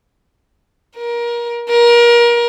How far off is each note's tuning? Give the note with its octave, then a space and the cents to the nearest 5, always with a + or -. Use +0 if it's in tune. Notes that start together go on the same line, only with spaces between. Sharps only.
A#4 +25
A#4 +30